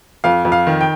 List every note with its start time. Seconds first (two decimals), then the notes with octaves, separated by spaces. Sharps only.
0.24 F2 F5
0.45 F2
0.52 F5
0.67 D#3
0.81 G5